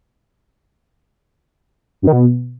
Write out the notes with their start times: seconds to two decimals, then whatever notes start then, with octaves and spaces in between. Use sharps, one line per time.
2.02 F#2
2.07 D#3
2.13 B2